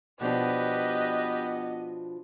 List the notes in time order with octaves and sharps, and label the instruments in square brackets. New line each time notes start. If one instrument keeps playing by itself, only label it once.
[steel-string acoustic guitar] B2 F3 D4 [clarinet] B3 [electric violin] G4 B4 [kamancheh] D#5